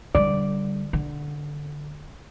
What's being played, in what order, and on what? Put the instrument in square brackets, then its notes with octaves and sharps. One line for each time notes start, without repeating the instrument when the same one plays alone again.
[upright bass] D3 G3 [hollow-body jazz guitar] D5
[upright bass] D3